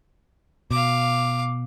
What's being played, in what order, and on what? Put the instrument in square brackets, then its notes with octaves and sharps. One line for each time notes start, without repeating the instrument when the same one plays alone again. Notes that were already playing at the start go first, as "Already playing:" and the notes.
[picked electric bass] B2 [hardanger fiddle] F5 D6